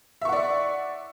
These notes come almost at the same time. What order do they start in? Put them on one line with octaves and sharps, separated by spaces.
E5 C#6 F#5 D5